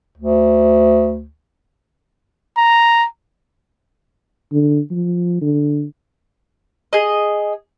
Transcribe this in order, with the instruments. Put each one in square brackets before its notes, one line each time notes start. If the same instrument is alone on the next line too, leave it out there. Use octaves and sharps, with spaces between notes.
[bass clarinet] D2
[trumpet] A#5
[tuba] D3
F3
D3
[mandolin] G#4 D#5